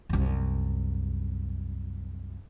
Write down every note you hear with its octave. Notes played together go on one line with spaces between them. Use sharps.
C2 F#2